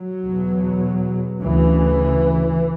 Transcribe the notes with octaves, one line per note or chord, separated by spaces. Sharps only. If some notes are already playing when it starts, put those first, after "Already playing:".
Already playing: F#3
E2 B2
D2 C#3 E3